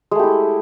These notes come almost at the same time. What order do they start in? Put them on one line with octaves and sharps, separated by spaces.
G#3 A3 G4 E4